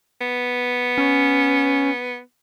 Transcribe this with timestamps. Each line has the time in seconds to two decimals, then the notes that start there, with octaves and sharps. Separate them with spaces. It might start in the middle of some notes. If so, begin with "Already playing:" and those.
0.21 B3
0.98 C#4